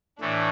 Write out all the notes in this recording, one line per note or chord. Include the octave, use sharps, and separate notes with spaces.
A2 E3 A3 D4